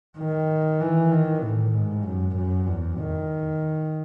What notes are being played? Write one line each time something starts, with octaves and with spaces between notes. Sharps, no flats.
D#3
E3
D#3
A2
G#2
F#2
F#2
E2
D#3